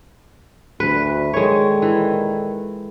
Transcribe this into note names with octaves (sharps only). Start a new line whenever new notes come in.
D2 B4
A#2 D#3 G#3 A4 C#5
E3